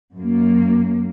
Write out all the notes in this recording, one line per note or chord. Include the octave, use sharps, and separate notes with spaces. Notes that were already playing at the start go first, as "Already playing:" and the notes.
F#2 A#3